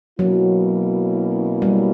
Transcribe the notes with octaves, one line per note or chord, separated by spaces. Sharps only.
B2 F#3 A#3 C#4 E4
G3